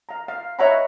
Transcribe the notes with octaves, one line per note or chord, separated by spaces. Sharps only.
F5 A#5
F5
C#5 D#5 E5 F#5 A#5 B5